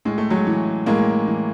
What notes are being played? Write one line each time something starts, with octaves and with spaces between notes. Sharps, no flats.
A2 G#3
A3
F#3 G#3
E3
A2 G#3 A#3
E3